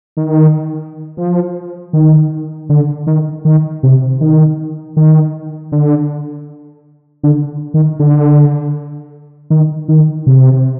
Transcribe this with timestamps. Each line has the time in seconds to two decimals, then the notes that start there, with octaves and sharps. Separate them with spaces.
0.17 D#3
1.17 F3
1.93 D#3
2.69 D3
3.07 D#3
3.45 D#3
3.83 C3
4.21 D#3
4.97 D#3
5.72 D3
7.23 D3
7.74 D#3
7.99 D3
9.50 D#3
9.88 D#3
10.27 C3